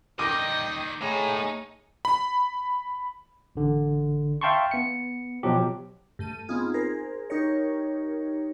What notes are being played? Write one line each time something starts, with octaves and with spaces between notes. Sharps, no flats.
D#3 G3 D#5 G5 D6 A#6
A2 D#4 G#4 C#5
B5
A1 D3
E5 F5 G5 A5 C6 C#6
B3 C#7
B2 F3 F#3 G4
G2 A3 D#7
B3 C4 D#4 F4 G#4
G#4 A#4 C5
D#4 G4 A#4 C#5